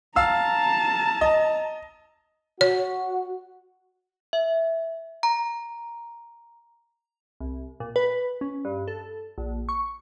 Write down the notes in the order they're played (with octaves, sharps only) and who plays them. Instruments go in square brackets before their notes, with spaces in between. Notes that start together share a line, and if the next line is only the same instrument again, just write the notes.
[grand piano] F5 E6 [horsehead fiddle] A5 A#5
[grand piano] D#5
[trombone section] F#4 [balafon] C#5
[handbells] E5
A#5
[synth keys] C2
A#2
B4
C#4
G2
A4
A#1
C#6